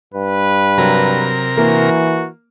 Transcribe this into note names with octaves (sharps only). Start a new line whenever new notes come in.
G2 B4
C3 F#3 A#4
E3 A#3 F#4